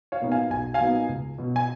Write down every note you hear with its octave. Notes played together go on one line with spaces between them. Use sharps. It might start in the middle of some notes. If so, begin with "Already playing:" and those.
C#5 F5
A#2 F#3 B3 D#4
F5 G#5
B1 G#5
F5 G#5
A#2 F#3 B3 D#4
C#2
B2 F#3
G#5